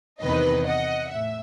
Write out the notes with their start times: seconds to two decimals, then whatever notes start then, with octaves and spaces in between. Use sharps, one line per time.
0.22 E2 C3 D#3 B4 D#5
0.67 D#5 F#5
1.12 A2 E5